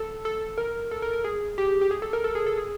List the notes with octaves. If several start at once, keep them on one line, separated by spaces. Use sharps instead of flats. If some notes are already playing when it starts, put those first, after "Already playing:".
Already playing: A4
A4
A#4
A4
A#4
A#4
G#4
G4
G4
G#4
A4
A#4
A4
G#4
A4
G#4